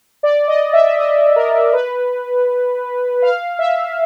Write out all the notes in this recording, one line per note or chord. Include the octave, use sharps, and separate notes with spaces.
D5
D#5
E5
D#5
A#4
B4
F5
E5